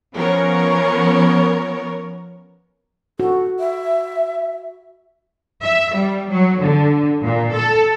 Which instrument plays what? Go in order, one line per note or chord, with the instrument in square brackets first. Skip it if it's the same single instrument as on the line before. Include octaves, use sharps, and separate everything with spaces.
[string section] F3 B3 C#4 A#4 C#5
[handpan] F#4 [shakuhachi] A4
[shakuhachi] E5
[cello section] E5
G3
F#3
D3
A#2
A4